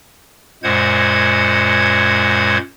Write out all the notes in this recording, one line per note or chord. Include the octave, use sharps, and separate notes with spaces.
F#2 A#2 G#3 C5 F#5 G#6